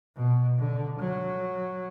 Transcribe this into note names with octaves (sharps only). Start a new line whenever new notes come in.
B2
D3
F#3